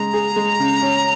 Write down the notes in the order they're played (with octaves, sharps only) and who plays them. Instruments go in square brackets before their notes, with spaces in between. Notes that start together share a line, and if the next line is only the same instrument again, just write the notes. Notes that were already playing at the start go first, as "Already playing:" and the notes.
Already playing: [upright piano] C#3 G#3 [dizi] A#5
[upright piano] G#4
G#3
C#3
C#4